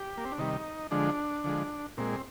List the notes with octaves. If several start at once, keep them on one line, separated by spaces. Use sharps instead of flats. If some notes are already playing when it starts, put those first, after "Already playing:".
Already playing: G4
A#3
C4
D4
C3 D#3 G3 D#4
D3 F3 G#3 D4
D3 F3 G#3
A#2 G#3 C4